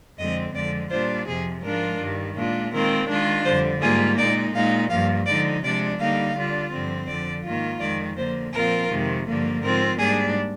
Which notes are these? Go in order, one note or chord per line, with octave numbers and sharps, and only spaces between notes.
F2 D3 G#3 C4 D#5
F2 D3 F3 G#3 D5
A#2 G3 D4 F4 C5
F2 C3 F3 G#4
G#2 F3 G#3 D4 F4 A#4
G2 D#3 G3
A#2 G#3 D4 F4
D#3 G#3 C4 F4 A#4
D#3 G#3 D4 F4
F2 D3 G3 C5
G#2 G3 A#3 F4 G#4
A#2 G#3 D#4 D5
A#2 G#3 D#4 F5
G2 F3 A#3 F5
D3 F3 G#3 D#4 D5
C3 F3 G#3 D4 D5
D3 G3 A#3 D#4 F5
D3 G3 D4 F4
G2 D3 F3 C4
F2 D3 F3 D5
G#2 D#3 A#3 F4
F2 D#3 G#3 D5
D3 F3 A#3 C5
A#2 F3 C4 F4 A#4
F2 C3 D#3 G#3
G2 D3 F3 A#3
G#2 F3 C4 F4 A#4
G#2 G3 A#3 D4 G#4